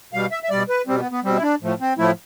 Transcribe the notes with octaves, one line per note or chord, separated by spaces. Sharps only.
B2 G3 F5
E5
E5
B2 G3 D5
B4
B2 G3 C4
B3
B3
B2 G3 C4
E4
D4
A2 F3 A3
C4
A2 F3 A3 E4